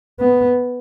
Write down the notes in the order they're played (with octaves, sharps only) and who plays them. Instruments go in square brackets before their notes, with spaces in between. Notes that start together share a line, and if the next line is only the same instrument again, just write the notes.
[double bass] B3